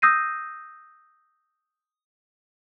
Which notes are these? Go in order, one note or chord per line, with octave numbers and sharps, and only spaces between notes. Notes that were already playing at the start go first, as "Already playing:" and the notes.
D#6 E6 G6 A#6 C7 D#7